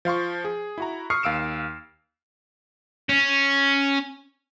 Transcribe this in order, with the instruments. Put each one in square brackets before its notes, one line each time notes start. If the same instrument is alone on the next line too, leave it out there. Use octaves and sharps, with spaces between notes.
[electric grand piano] F3 F5 C6 C#6
G#4
E4 F#4 A#5
C#6 D#6 F6 C7 C#7
D#2 F5 E6 D7 E7
[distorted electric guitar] C#4